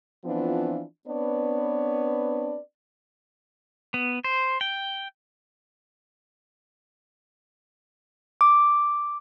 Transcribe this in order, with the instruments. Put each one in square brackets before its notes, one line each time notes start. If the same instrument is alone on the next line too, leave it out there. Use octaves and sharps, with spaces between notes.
[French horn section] E3 F3 B3 C4 D4 F4
B3 C4 D4 B4 C#5 D5
[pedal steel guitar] B3
C5
G5
[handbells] D6